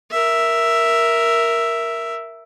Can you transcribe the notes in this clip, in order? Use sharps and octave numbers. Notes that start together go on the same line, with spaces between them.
A#4 E5